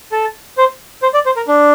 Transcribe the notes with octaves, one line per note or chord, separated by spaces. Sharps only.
A4
C5
C5
D5
C5
A#4
D4